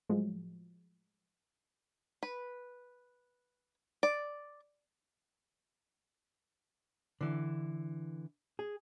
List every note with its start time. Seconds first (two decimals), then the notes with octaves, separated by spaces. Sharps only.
0.09 A2 F3 F#3 G#3
2.23 B4
4.03 D5
7.21 D3 E3
8.59 G#4